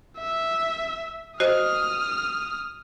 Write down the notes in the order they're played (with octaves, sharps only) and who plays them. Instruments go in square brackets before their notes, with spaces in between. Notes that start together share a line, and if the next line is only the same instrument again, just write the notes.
[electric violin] E5
[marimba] F#4 C5 D#5 [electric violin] D#6 F6